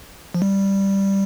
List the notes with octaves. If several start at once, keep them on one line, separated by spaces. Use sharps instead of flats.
F3
G3